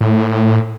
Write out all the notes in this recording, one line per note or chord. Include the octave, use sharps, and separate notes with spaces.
A2